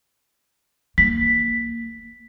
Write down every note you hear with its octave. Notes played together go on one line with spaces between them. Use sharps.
A#3 B6